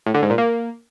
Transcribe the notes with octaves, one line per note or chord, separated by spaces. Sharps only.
A2
D3
G#2
A#2
A#3